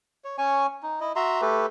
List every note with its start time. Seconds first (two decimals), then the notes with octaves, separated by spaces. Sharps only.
0.24 C#5
0.38 C#4 C#5 G#5 C#6
0.83 D#4
1.01 E4 D#5
1.16 F#4 E5 A#5 C6
1.41 A3 G4 A4 B4